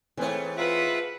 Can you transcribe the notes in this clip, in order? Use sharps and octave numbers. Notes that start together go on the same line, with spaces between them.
G#2 E3 A3 C4 C#5
F4 B4 E5 F#5